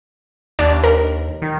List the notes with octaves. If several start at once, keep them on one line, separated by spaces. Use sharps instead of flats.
D#2 D4
A#4
D#3